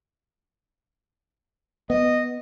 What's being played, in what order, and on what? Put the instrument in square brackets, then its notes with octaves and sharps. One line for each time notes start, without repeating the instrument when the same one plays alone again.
[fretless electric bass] B3 [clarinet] D#5